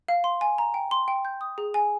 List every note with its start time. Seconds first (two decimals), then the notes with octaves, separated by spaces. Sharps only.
0.08 F5
0.24 C6
0.41 G#5
0.58 A#5
0.74 G5
0.91 C6
1.08 G5
1.25 G6
1.41 D#6
1.58 G#4
1.74 G#5